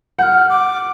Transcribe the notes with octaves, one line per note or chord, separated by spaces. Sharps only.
F#5 F6 G6
D6